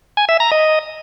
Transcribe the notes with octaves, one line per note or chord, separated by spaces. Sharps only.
G#5
E5
A#5
D#5